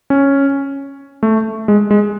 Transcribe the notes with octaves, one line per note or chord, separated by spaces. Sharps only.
C#4
A3
G#3
G#3